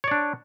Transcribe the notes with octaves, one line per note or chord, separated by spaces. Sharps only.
D4 C#5 D5